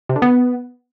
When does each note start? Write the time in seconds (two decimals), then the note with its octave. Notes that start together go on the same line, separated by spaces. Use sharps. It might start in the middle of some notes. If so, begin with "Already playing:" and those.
0.09 C3
0.16 D3
0.22 B3